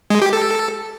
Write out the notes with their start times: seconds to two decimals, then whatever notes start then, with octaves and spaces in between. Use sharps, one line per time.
0.10 G#3
0.22 G4
0.33 A4